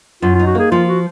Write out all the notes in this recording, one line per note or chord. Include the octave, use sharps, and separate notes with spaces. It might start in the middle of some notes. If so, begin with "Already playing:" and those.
F#2 F4
F4
D#4
F#4
A#3 G#4
F3 F4
F#4